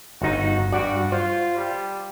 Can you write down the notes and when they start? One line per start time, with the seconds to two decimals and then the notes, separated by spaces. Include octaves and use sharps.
0.22 G1 D#4 F#4
0.72 G2 F#4 D5
1.12 F4 C5
1.56 G3